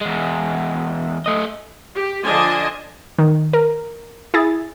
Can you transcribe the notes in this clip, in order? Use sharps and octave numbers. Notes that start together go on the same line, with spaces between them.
E2 G#3
A3 D#5
G4
D3 F3 D4 F4 D#5 G#5
D#3
A#4
E4 G#4 A6